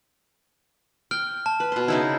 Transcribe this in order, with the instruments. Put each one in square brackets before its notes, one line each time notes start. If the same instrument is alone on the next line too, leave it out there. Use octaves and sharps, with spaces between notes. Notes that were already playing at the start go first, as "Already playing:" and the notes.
[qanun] G5 [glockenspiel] F6
[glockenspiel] A5
[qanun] B4
B2 C6
C#3 D#4 E4